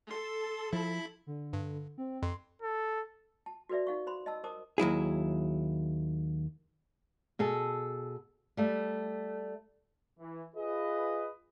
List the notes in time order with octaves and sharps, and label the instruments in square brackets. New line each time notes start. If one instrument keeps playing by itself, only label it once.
[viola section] A4 [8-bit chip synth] C6
[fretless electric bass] F3 [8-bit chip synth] E4 B5
[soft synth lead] D3
[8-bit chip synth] G2
[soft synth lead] C4
[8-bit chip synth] F2 [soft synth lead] C6
[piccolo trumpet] A4
[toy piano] A5
F#4 A4 B4 D5 E5
D#4 F5 C#6
C5 B5 C6
D#5 A5 E6
A#4 C5 A5 D6 D#6
[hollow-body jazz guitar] D#2 F#3 E4 G#4
[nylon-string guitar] B2 G#4 A4
G3 A3
[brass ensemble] E3
F4 G#4 B4 D#5